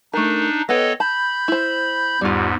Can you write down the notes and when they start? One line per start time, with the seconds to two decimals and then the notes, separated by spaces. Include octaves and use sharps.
0.14 A3 D4 D#4 A#4
0.69 B3 A4 B4 C#5 D#5 G5
1.00 A5 B5 G6
1.48 E4 C5
2.21 E2 G#2 G3 F4